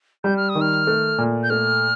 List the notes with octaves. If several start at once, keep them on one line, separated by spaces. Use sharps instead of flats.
G3 G6
F6
D#6
D#3
F6
A3
A#2
G6
A3 F6